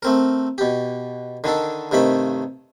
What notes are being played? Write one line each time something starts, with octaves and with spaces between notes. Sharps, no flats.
A3 C4 A#4
B2 G4
D3 D#3 D4 A4
G2 C3 D#3 A3 B5